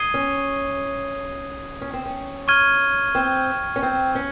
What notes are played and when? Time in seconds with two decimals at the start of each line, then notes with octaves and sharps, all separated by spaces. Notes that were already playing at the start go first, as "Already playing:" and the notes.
Already playing: D#6 G#6 C7 D#7 G7
0.14 C#4
1.81 C#4
1.94 C4
2.06 C#4
2.48 C#6 F6 G#6 D#7 G7
3.15 C4
3.76 C#4
3.83 C4
4.15 C#4